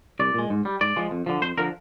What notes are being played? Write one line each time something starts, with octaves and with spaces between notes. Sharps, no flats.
C2 D5
A#2 G#3
G#2
G3
G#2 D5
F3 G#3
F2
D3 F3
F2 C5
D3 F3 A#4